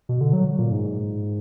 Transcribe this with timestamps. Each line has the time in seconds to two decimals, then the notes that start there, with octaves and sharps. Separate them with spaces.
0.09 B2
0.21 D3
0.33 F#3
0.59 A#2
0.71 G#2